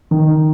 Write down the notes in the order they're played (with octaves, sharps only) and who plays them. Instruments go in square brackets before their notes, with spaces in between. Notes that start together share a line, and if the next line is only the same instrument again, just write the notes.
[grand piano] D#3